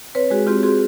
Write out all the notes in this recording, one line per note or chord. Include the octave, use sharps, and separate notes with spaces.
C4 B4 C#5
G#3 F#4 G#4
C4 F4 G4
C4 F#4 G#4